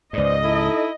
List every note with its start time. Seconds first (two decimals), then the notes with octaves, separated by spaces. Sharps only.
0.13 C#2 G#2 B4 C5 D5 D#5
0.44 D#4 E4 A4